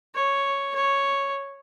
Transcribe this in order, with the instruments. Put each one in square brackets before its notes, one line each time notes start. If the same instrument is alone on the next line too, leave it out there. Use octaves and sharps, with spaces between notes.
[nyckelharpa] C#5
C#5